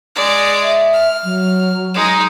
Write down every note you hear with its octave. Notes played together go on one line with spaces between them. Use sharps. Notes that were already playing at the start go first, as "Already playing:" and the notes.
G#3 D5
E5
F6
F#3
G#3 D#4